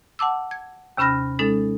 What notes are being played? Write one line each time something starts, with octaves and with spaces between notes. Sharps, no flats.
F#5 A5 D6 E6
G#6
D#2 C3 C#4 B5 F6 A#6
G#3 C#4 D#4 A4 A6